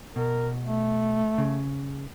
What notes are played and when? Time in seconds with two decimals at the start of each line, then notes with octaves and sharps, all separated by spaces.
0.16 B2 A#4
0.64 A3
1.38 C#3